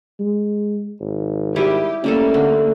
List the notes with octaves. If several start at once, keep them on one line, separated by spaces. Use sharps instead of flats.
G#3
G#1
G3 E4 G4 D#5
G3 A3 A#3 C#4 A4
D3